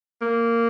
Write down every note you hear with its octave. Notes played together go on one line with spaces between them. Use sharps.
A#3